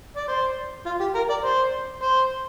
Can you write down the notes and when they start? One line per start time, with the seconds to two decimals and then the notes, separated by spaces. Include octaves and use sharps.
0.17 D5
0.28 C5
0.86 F4
1.00 G4
1.15 A#4
1.30 D5
1.45 C5
2.03 C5